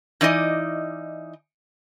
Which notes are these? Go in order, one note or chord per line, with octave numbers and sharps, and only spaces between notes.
E3 D#4 D5 D#5